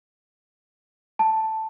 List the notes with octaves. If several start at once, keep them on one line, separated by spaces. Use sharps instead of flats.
A5